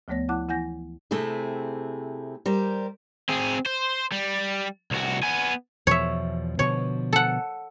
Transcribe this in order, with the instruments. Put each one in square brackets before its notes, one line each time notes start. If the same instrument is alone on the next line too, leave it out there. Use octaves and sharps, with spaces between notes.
[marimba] D2 F3 A3 B3 C#5 A#6
F3 E4 F#5 A5 D6 F#6
E3 E4 F#5 G#5 G6 A#6
[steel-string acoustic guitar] C3 A3 C4 E4 G#4
G3 A#4 C5
[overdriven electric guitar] C4 G#4
C5
G3
C2 F#4
B3 G#5
[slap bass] E2 B2 F3 [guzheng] C#5 E5
[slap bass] B2 D3 F3 [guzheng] C#5
[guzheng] A4 F#5